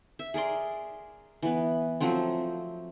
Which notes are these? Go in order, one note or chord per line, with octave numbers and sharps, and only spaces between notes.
E5
G#4 A#4 D5 C6
E3 B3
F3 F#3 A3 C4